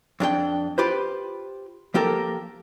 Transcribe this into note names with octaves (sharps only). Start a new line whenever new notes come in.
F2 D4 G4 G5
F4 G4 B4 C5
F3 A#3 G4 A4 A#4